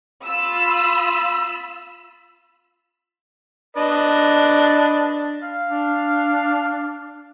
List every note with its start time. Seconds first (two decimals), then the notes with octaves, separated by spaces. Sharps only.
0.24 F4 B5 E6
3.76 D4 B4 D5 D#5
5.43 F5
5.70 D4